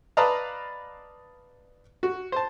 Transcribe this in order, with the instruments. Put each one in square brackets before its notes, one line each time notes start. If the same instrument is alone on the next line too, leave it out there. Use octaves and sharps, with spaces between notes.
[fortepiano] B4 D5 D#5 F5 A5 A#5
F#4
C5 A5